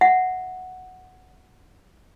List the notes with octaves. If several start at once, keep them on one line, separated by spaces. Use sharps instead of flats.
E5 F#5